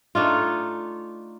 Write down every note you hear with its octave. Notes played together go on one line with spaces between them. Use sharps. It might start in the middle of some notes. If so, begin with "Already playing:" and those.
A3 D4 D#4 F4